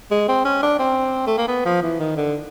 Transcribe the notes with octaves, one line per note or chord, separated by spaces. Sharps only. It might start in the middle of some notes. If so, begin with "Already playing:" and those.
G#3
C4
C#4
D4
C4
A3
A#3
B3
F3
E3
D#3
D3